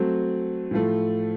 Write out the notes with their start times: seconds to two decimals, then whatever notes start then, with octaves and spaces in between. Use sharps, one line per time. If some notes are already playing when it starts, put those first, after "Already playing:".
Already playing: F#3 A3 C4
0.71 A2 F3 A3